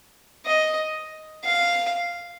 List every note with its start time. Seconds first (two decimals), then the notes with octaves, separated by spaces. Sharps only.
0.46 D#5
1.44 F5